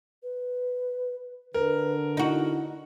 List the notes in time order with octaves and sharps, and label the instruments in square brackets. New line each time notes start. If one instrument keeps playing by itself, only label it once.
[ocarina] B4
[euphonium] D3 [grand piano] A#4 [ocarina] B4
[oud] D#4 F#4 [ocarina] E4